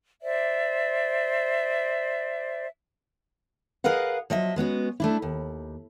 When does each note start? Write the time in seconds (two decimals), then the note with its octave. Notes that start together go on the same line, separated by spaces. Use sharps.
0.22 C5 D5 E5
3.84 G#4 A#4 B4 D#5 F5 F#5
4.30 F3 F#3 D#5 E5
4.56 G#3 B3 C#4 F#4
5.00 A3 D4 E4
5.22 D#2